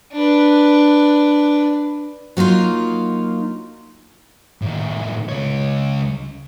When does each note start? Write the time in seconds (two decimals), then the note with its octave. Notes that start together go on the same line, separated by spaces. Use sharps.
0.13 D4 B4
2.37 F#3 A#3 D#4 F4
4.62 A2 D#3
5.29 C#2 C#5